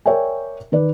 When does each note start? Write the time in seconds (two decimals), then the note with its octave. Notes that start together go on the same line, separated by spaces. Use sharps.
0.06 A#4 C#5 D5 E5 G5 G#5
0.72 D#3 B4 D5